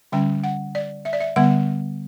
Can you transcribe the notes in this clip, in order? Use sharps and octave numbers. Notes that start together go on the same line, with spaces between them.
D3 G3 C#4 G5
F#5
D5
E5
D5
E5
D3 G3 B3 F#5